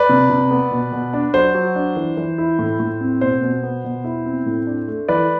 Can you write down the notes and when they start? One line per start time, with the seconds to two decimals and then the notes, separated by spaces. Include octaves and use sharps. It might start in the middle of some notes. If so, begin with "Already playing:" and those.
Already playing: B4 D5
0.09 C3
0.30 C3
0.51 B3
0.72 B2
0.92 B2
1.13 D4
1.34 F#3 C5
1.55 F#3
1.75 D4
1.96 E3
2.17 E3
2.38 E4
2.59 A2
2.80 A2
3.01 C4
3.21 B2 C5
3.43 B2
3.63 B3
3.84 B2
4.04 E4
4.26 C4
4.46 A2
4.67 D4
4.88 A3
5.08 E3 B4 D5